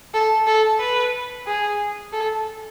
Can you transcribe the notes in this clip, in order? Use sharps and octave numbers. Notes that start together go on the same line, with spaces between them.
A4
A4
B4
G#4
A4